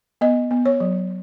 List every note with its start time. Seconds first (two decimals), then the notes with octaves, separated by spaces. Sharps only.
0.21 B3 D#5
0.51 B3
0.66 C#5
0.80 F#3